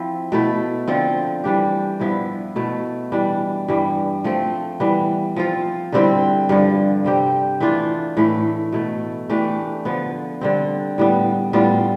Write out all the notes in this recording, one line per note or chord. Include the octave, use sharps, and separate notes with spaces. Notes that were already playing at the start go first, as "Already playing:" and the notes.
Already playing: F3 C4 E4
B2 A3 E4
D3 F3 C4 F4
E3 G3 D4 G4
G2 F3 B3 E4
B2 A3 E4
E3 G3 D4
G2 E3 G3
F3 A3 C4
E3 G3 B3
F3 C4 F4
D3 G3 C4 E4
G2 D3 F3
C3 G3 C4 G4
E3 A3 D4 F4
A2 E3 A3 E4
B2 A3 E4
E3 A3 D4 G4
D3 F3 B3
D3 G3 C4
A2 G3 B3
A2 G3 B3 F4